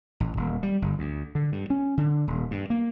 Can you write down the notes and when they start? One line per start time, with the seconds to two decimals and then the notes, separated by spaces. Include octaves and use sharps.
0.20 A1
0.37 D#1
0.63 G3
0.82 G1
0.99 D2
1.35 D3
1.52 G2
1.70 C#4
1.97 D3
2.27 D#1
2.51 G2
2.70 A#3